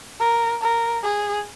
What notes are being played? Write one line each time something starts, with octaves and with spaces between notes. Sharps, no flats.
A#4
A#4
G#4